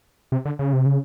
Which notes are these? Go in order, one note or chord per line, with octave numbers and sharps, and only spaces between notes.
C3
D3
C#3
C3
C#3